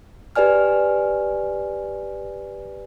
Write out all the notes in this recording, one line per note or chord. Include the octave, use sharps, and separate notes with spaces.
G4 B4 D5 G#5 F6